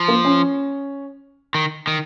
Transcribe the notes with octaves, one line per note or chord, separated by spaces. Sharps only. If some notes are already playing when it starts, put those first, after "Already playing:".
Already playing: F3
A#3
C#4
D#3
D#3